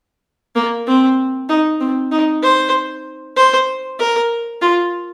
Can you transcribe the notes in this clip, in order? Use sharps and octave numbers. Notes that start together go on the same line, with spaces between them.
A#3
C4
D#4
C4
D#4
C5
C5
A#4
F4